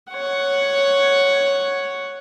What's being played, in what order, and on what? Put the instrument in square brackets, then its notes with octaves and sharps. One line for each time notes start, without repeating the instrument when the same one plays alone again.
[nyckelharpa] C#5 F#5